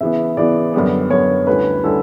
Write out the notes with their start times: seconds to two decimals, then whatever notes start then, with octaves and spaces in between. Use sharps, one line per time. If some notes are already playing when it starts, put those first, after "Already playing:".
0.01 C#3 E3 B3 E5
0.37 C#3 E3 B3 D5
0.74 F#2 D3 G3 B3
1.10 F#2 D3 G3 B3 C#5
1.47 D2 D3 G3 C#4 E4 B4
1.84 D3 G3 C#4 E4 A4